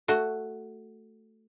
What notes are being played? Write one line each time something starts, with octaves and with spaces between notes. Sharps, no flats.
A3 F#4